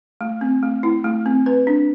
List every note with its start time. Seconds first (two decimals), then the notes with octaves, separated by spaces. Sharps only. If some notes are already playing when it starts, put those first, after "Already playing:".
0.21 A3
0.41 C4
0.63 A3
0.83 E4
1.04 A3
1.26 C4
1.46 B4
1.67 D4